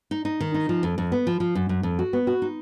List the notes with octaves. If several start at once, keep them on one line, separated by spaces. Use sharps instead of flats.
D#4
D#4
D#3
D#4
F3
F2
F2
B3
F3
F3
F#2
F#2
F2
F#4
B3
F#4
D#4